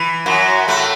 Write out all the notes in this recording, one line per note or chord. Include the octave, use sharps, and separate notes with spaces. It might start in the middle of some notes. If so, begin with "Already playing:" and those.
Already playing: E3
F#2 F#3
A2 A3